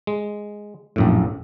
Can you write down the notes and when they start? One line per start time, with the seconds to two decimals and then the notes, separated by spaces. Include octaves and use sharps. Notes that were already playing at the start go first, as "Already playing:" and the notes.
0.07 G#3
0.96 A#1 F#2 A2